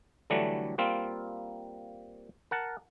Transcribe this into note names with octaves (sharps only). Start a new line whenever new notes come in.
D3 E3 F#3 G3 A3 D4
G3 A#3 C4 F4
A#4 F#5 A5